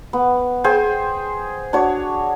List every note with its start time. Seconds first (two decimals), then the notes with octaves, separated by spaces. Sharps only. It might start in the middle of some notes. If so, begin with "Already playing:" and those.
0.13 B3
0.64 G#4 C5 G5
1.73 D4 F#4 C#5